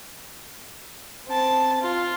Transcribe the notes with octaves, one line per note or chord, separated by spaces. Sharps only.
C4 A5
F4